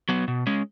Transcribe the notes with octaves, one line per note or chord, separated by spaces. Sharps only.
F#3 B3
B2
G#3 C#4